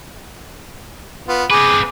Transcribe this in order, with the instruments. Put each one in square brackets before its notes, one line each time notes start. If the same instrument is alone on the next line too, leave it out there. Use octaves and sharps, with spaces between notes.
[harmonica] B3 F4
[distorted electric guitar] C4 B4 [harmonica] G#4 [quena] D6